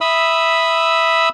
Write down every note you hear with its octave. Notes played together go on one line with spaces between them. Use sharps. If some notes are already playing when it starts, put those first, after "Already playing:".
E5 B5 D#6 E6